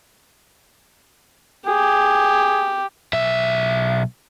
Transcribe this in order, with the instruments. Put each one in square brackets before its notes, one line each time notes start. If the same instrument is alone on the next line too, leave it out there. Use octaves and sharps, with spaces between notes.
[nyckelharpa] G4 [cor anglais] G#4
[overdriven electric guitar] B1 E5